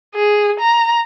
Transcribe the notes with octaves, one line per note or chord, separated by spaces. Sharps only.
G#4
A#5